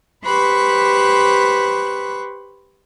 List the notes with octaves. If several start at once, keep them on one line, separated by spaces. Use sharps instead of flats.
G4 B4 C5 B5 C#6 F#6